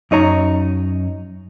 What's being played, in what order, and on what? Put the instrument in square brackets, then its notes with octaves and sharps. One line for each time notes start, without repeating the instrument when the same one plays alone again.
[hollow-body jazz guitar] F#2 D#4 C#5 A#5